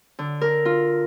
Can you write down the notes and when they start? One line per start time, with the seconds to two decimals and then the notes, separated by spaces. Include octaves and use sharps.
0.19 D3
0.41 A#4
0.65 F4